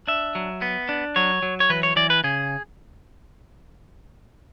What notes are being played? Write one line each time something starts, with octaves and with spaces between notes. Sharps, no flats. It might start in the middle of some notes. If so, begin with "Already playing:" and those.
D4 E5
F#3
B3
D4
F#3 C#5
F#3
C#5
E3 B4
C#5
E3 D5
B4
C#3 G#4